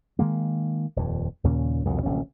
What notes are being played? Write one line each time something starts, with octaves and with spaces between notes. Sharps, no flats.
D#3 G#3 A#3
D#1 F2
D#2 A#2 C#3 C#4
C2 F2 B2 D3
D1 A#1 C3 C#4